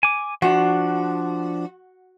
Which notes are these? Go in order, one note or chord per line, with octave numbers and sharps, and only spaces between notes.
G#5 D6
F3 D4 F#4